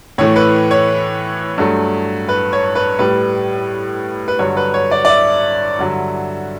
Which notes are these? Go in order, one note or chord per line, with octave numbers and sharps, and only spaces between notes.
A2 E3 A3 C#5
B4
C#5
G2 F#3 A3
B4
C#5
B4
A2 G3 B4
B4
G2 D3 F#3 C#5
B4
C#5
D5
D5
E5
G2 D3 F#3